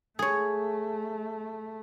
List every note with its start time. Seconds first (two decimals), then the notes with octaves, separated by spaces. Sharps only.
0.19 A3 G#4 C#5